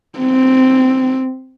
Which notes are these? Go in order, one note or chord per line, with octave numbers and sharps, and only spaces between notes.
C4